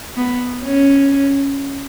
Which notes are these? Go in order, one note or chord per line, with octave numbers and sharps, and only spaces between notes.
B3
C#4